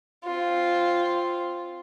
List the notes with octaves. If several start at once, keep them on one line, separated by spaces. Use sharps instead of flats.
C4 F4